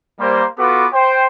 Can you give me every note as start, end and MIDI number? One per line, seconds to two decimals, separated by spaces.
0.20 0.44 55
0.20 0.44 58
0.20 0.44 72
0.58 0.87 59
0.58 0.87 65
0.58 0.87 66
0.58 0.87 69
0.58 0.87 71
0.58 0.87 86
0.93 1.25 72
0.93 1.25 79